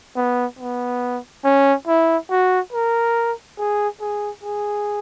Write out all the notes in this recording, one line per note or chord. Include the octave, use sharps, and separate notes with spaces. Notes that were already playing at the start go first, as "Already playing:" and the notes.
B3
B3
C#4
E4
F#4
A#4
G#4
G#4
G#4